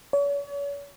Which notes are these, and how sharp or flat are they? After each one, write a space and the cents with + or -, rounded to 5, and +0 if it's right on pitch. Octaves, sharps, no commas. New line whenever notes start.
C#5 +40